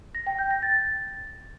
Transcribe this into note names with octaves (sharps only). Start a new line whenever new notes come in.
A#6
G5
G6
A#6
A6